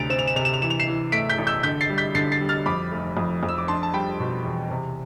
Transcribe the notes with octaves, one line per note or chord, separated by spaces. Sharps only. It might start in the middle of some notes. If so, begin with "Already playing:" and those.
Already playing: D2 C3 A6 D7 F7
C4 E7
F7
E7
C3 F7
E7
F7
E3 E7
F7
C7 E7
E3
A3 B6 D7
G6 B6
A1
E6 G6
D3 G6 B6
A6 C7
G3
G6 B6
D3 A6 C7
A6 C7
G3
F6 A6
F2 B5 D6
F1
F2
F2
E6
D6
D4 A5 C6
A5
G3 G5 B5
B2
E2
C3